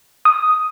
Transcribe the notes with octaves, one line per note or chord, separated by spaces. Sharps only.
D#6